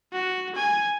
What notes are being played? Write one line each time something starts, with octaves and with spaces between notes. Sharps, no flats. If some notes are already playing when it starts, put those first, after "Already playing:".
F#4
G#5